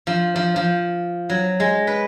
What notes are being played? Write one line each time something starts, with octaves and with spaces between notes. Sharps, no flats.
F3
F3
F3
F#3
G#3
B4